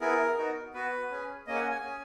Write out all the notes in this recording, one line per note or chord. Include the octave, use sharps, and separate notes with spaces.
B3 E4 G#4 A#4
B3 D#4 F#4
B3 F#4 B4
C#4 G#4
A#3 C#4 G#4 D#5
F#5
G#5
G#5
C#4 G#4